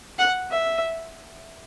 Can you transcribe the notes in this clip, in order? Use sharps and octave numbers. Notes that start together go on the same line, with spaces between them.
F#5
E5